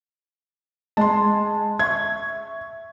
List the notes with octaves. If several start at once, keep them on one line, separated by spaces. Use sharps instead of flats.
G#3 A5 C6
E5 C#6 G#6